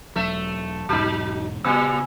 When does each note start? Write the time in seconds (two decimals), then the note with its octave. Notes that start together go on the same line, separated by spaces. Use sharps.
0.16 E1 F#3 A3 E5
0.89 E1 G#2 F#3 D#4
1.64 A#2 C#3 G3 B3 G#5 E6